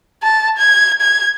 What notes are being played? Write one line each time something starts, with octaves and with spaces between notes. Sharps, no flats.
A5
G#6
G#6